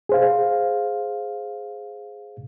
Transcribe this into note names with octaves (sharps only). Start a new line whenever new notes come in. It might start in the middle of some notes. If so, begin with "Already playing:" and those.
G#4 C5 F5